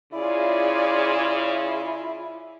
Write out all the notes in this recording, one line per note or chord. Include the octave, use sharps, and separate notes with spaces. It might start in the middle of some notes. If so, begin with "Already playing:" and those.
C#3 E4 F4 G#4 D5